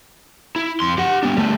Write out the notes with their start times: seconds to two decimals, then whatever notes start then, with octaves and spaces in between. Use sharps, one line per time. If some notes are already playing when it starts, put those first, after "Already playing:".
0.56 E4
0.80 F2 C6
0.98 G4 F#5
1.23 B3 D4
1.37 G3 A3